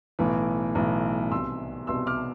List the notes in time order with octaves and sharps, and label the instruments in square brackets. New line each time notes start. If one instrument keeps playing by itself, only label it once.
[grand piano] B1 A2 E3
B1 A2 E3
C2 B2 C6 E6
C2 B2 C6 E6
D6 F6